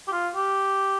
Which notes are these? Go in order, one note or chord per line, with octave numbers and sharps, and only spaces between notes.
G4
F4
G4